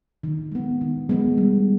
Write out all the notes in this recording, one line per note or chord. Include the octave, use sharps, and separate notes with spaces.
D#3
G#3 B3
D#3
G#3 B3
G3